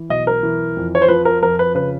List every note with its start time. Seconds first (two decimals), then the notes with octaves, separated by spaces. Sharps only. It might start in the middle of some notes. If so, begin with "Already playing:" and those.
Already playing: E3
0.09 B1 D#5
0.27 A#4
0.43 E3
0.77 F2
0.95 C#5
1.02 C5
1.08 F3 B4
1.25 A#4
1.42 F2 A#4
1.59 B4
1.75 C#3 B4